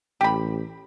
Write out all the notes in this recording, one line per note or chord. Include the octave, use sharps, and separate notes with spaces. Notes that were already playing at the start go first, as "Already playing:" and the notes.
A1 G4 B5